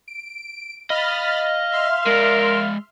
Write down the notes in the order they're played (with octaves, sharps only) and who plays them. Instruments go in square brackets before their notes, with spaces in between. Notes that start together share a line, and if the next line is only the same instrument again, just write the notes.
[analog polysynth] D7
[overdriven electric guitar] D#5 [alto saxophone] F5 [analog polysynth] B5 F6 A6
[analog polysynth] E5 C6 F6
[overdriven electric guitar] G#3 D5 [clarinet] A#4
[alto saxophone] F5